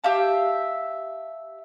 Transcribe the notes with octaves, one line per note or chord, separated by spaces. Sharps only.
G4 E5 F5 A5